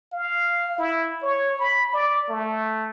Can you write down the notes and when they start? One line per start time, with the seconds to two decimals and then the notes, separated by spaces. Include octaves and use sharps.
0.13 F5
0.78 E4
1.22 C#5
1.59 B5
1.93 D5
2.29 A3